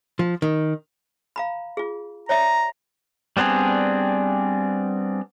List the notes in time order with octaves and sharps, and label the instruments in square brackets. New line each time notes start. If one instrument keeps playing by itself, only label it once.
[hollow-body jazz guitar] F3
D#3
[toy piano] F5 A#5 B5
F4 G#4
[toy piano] C#5 D5 E5 [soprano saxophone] A#5
[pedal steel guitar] G3 B3 C4 D4 G#4